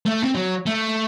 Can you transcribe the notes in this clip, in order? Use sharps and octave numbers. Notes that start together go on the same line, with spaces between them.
A3
C4
F#3
A3